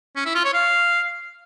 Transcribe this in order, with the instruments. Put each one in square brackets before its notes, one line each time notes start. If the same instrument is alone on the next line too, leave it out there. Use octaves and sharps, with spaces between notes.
[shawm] C#4
E4
F4
C#5
F5